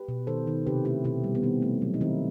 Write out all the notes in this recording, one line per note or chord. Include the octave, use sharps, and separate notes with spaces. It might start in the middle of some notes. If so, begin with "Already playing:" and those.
Already playing: G4 B4
B2
D#3 A4 C5
D#3
C3 G4 B4
A3 E4 G4
B2 E4 G4
G3
B3
D#3 C4
A3
F#3
D#4
D#3 C4 E4